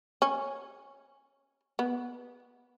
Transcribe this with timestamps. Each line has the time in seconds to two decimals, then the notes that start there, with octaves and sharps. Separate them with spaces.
0.22 C#4
1.79 B3